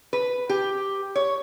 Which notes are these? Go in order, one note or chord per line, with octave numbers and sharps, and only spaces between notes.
B4
G4
C#5